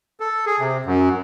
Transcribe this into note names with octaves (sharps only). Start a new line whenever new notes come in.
A4
G#4
C3
F#2